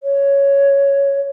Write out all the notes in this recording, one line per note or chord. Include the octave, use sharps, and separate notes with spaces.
C#5